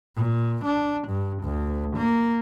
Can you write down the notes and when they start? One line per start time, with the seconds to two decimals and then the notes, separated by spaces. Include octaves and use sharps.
0.16 A#2
0.65 D4
1.08 G2
1.43 D2
1.97 A#3